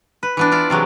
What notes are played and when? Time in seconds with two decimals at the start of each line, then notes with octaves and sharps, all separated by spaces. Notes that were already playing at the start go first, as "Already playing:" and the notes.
0.23 B4
0.37 E3 B3 D4
0.52 E4 F4 D5
0.70 C3 E3 F#3 G#3